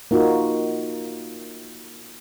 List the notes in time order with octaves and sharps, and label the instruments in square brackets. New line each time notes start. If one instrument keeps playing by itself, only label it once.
[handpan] A#3 D#4 F4 F#4 A#4